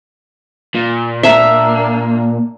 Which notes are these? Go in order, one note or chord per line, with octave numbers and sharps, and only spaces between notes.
A#2
A#3 D4 E5 A#5